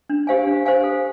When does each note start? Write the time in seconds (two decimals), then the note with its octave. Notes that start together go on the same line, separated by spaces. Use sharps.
0.10 D4
0.27 G4 C5 F5 G#5
0.47 D4
0.66 G4 C5 F5 G#5
0.84 A4